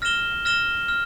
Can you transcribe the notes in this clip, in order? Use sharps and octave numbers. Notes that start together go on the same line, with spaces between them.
F6 A#6 E7 G7
F6 A#6 E7 G7
F6